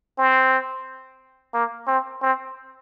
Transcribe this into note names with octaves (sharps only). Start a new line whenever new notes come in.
C4
A#3
C4
C4